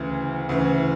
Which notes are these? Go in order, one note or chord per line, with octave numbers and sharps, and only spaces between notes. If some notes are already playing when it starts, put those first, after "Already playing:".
Already playing: D2 C#3 E3
D2 C#3 E3